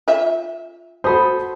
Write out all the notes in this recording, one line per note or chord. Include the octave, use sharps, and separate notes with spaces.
F4 E5
F#4 A4 C5 B5 D#6